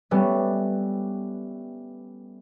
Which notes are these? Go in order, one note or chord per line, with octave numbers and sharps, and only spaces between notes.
G3 A3 B3 C#4